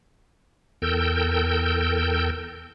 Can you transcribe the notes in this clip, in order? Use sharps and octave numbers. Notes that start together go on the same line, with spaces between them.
E2 A4 A#4 G5 E6 G6